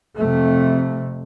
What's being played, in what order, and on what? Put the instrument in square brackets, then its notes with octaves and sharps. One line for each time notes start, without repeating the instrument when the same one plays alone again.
[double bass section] F2 C3 A3